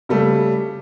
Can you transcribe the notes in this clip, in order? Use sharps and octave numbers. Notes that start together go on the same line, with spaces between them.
C#3 G3 A3